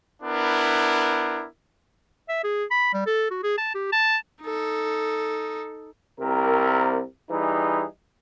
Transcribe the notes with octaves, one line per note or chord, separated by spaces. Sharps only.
B3 D4 E4 A#4
E5
G#4
B5
G3
A4
F#4
G#4
A5
G4
A5
D#4 A4
C2 C3 A#4
E3 G3 D#4 G#4